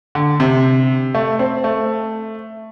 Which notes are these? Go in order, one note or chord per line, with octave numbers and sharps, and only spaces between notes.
D3
C3
A3
C4
A3